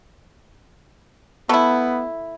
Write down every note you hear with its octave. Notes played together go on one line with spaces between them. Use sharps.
A3 B3 E4